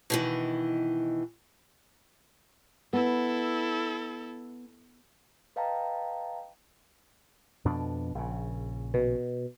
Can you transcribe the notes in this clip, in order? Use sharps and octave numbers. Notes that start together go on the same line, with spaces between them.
B2 D#3 E3
B3 E4 A4
B4 D#5 F5 G5 A5 A#5
F2 B2 D4
A#1 C#3
B2